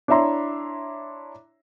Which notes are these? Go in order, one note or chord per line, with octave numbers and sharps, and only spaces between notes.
D4 E4 C#5 E5 A#5 C6